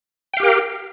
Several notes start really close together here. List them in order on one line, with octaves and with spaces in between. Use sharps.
G5 F5 G4 A#4